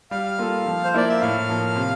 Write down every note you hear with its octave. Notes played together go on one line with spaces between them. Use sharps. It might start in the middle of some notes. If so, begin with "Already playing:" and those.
G3 F5
A#3 F4 A4
F3
C5
A#3 E4 D5
E5
A2 F5
F3 A#3
C3